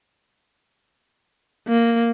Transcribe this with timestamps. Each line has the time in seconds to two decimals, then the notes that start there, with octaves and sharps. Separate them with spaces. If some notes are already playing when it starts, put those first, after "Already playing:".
1.68 A#3